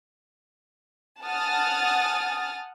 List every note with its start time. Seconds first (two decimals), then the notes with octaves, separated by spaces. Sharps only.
1.24 F#5 G#5 A5 D#6 F6 A6